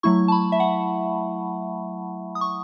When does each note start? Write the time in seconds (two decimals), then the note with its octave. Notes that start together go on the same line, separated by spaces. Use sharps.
0.03 F#3 A3 E4 C#6
0.28 A5
0.32 B5
0.52 E5
0.60 F#5
2.35 D#6
2.41 C#6